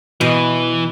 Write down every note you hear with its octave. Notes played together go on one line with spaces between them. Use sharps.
B2 E3